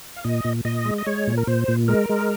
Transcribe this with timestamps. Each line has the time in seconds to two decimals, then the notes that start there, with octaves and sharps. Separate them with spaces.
0.16 F5
0.24 A#2 D#5
0.45 A#2
0.65 A#2 D#5
0.85 G#3
0.98 D#5
1.06 G#3 C#5
1.27 A#2
1.38 A#4
1.47 A#2 C5
1.68 A#2
1.88 G#3 A#4
2.09 G#3